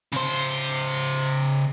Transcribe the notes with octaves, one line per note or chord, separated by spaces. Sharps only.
C#3 C5